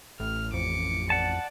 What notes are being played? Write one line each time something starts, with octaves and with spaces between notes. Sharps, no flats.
A1 A2 F6
F2 D6 C#7
D5 F#5 A5